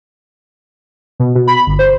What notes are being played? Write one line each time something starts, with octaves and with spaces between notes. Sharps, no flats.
B2
B2
B5
G1
C5